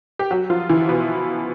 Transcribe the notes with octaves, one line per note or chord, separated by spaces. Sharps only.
G4
F#3 F#4
F3 F4
E3 E4
B2 B3